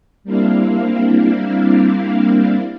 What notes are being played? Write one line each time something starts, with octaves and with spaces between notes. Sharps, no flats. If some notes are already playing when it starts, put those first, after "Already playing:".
G3 A#3 C4 D4 E4 F5